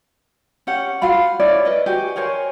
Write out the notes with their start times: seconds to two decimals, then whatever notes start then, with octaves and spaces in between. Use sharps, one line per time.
0.67 C#4 G4 F#5
1.02 F4 F#4 F5 B5
1.40 C#4 E4 D5
1.65 B4 D#5
1.86 F#4 G4 G#5
2.16 A#4 C5 C#5 G#5